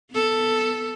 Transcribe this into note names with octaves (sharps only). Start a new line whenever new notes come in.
B3 A4